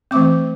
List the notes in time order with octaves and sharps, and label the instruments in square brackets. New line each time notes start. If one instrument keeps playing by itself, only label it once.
[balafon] E3 A3 C4 D6